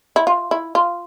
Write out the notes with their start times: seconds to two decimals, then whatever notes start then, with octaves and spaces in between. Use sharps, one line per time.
0.16 E4
0.27 F4
0.51 E4
0.75 F4